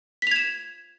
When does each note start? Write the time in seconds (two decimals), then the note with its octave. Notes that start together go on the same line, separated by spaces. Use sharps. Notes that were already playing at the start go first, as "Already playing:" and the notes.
0.22 B6
0.27 F7
0.31 G#6
0.36 E7